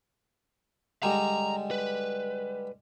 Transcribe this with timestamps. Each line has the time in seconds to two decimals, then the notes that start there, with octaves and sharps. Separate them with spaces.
1.03 D3 G3 G#3 A#5
1.71 B4